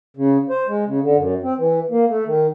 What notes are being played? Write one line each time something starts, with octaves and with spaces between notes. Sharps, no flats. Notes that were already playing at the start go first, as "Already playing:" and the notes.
C#3
C5
G#3
C#3
D3
F#2
C4
E3
A#3
A3
D#3